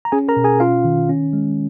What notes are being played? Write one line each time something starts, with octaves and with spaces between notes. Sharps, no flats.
A#5
C#4 G#4 G#5
A#4 A#5
B2
G#4 G#5
C#4 F4 F5
D#3
C#4
G#3